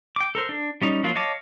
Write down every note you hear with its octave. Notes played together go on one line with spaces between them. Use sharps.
G5 D6
A4 A#4 C5
D4
G3 C#4 D#4
F3 F#3 A#3 F4
C#5 D#5 F5 A5 D6